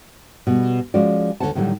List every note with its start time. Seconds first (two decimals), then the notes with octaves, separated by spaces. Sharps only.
0.47 B2 G3
0.94 F3 G#3 C#4 F#4 D5
1.40 D2 D3 F4 C#5 F#5 A5
1.55 A2 D3 D#3 F#3 G3